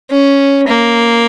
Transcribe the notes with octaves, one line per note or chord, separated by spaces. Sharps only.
C#4
A#3